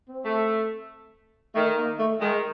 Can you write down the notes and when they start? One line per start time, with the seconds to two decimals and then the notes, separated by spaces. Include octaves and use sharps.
0.08 C4
0.25 A3
1.55 D#3 A3
1.78 A#3
1.99 A3
2.20 D#3 G#3